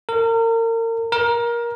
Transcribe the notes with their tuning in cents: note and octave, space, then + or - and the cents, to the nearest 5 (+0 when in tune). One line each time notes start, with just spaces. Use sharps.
A#4 -35
A#4 +20